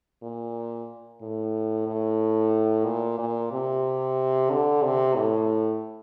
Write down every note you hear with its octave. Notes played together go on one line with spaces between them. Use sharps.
A#2
A2
A2
A#2
A#2
C3
D3
C3
A2